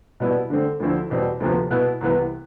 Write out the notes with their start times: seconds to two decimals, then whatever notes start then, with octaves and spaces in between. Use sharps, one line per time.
0.20 B2 G3 B3 E4
0.50 D3 A3 C4
0.80 D2 D3 F3 C4 E4
1.10 E2 B2 G3 C4
1.40 D2 C3 F3 B3
1.70 B2 B3 E4
2.01 C2 C3 E3 B3